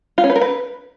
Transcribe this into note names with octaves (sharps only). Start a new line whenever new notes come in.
F4
C#4
B4
A#4
B4